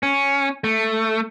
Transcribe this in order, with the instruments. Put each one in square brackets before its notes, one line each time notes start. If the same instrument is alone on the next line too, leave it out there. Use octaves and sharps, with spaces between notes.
[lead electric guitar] C#4
A3